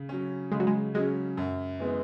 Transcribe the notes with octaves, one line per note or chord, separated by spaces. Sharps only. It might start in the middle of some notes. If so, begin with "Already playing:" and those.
Already playing: C#3
F#3 C#4
C#3 G#3
F#3
G#3
F#3 G#3 C#4
F#2
E3 G#3 B3